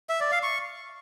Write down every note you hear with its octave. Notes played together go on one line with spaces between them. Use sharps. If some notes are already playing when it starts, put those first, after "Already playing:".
E5
D5
F5
C#6